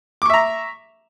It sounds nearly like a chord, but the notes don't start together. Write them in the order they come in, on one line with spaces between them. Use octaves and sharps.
D6 C#6 E5 A#5